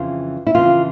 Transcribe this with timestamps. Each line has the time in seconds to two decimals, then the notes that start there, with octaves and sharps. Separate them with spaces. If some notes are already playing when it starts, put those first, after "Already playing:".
Already playing: F2 C#3 E3 F4
0.47 E4
0.55 F2 C#3 E3 F4